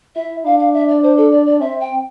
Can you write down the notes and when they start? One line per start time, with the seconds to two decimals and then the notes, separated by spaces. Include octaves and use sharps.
0.16 E4 E5
0.45 D4 F5
0.59 F5
0.74 E5
0.89 D5
1.03 C5
1.17 A4
1.32 D5
1.46 D5
1.61 C4 E5
1.81 G5